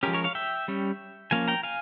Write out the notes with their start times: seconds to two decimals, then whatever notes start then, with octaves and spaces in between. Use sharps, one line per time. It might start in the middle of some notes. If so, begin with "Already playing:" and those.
0.03 F3 G#3 C#4 G4 A#4
0.13 A#4 C#5
0.24 C#5 F5
0.35 E5 G5
0.68 G3 C#4
1.31 F3 A#3 C#4 F5 G#5
1.48 G5 A#5
1.63 F5 G#5